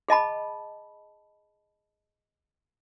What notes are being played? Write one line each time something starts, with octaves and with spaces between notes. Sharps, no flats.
G#4 D#5 A5 B5